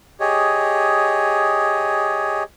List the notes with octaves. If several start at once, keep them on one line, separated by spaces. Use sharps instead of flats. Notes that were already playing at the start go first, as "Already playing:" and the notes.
G4 G#4 C#5 D#5